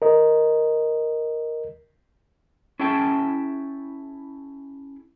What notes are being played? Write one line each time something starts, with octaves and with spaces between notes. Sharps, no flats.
A#4 D#5
C#4 E4 G#4 E5 G5 A5